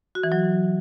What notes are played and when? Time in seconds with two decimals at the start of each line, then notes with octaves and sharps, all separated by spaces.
0.15 F#4
0.23 E3
0.32 F#3